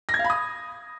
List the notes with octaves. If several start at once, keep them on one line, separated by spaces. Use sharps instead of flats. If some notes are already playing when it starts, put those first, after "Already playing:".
A#6
G#6
F5
B5
D#6